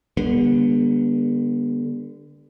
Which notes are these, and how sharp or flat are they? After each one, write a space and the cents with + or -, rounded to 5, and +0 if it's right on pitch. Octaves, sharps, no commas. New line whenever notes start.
D3 +0 G3 +35 B3 -35